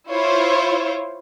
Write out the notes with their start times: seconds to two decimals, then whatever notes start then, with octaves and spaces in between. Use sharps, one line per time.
0.10 E4 F4 C5 C#5